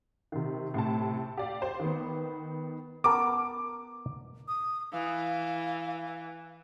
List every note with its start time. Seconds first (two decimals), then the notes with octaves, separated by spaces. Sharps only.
0.32 C3 D#3
0.74 A2 C3 A5
1.37 G4 D5 F5
1.62 G4 C5
1.80 D#3 B3
3.04 B3 A#4 A5 D6
4.48 D#6
4.93 E3 F5